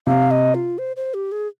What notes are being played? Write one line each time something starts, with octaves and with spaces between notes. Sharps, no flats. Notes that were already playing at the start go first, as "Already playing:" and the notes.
C3 F5
D#5
F4
C5
C5
G4
G#4